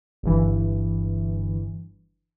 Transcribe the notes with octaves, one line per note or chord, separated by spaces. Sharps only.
G1 G2 E3